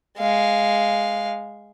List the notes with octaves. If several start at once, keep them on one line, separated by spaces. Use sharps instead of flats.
G#3 F5